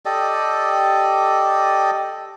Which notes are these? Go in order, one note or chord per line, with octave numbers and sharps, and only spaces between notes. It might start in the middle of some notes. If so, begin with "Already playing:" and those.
G4 A4 D5 D#5